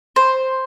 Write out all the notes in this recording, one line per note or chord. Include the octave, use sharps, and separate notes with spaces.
C5